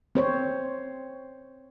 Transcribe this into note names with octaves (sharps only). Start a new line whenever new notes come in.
C4 C5 C#5